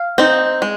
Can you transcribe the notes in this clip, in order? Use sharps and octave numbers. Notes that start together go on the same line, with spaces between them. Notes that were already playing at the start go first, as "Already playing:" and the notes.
Already playing: F5
C4 D#4
G#3